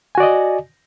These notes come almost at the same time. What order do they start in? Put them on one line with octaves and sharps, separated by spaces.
G#5 F#4 D5 D#5